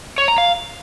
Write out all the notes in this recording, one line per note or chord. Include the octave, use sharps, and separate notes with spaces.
C#5
A#5
F5